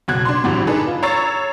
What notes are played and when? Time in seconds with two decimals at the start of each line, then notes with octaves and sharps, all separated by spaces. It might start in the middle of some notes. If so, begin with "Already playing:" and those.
0.08 F#1 B2 F#6 G#6
0.25 D4 C6
0.44 A#1 A2 D3 F#3 G3
0.67 D4 D#4 G#4 A4 B4
0.87 F4
1.03 C#5 A#5 C#6 E6 A6 C7